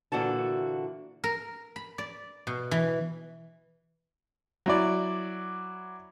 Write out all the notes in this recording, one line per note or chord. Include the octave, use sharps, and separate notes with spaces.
A#2 D3 E3 F#4 A5
A#4
B5
D5
B2
E3
F#3 E4 D5